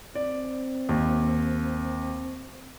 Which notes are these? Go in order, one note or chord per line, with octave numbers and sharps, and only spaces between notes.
C4 D5
D#2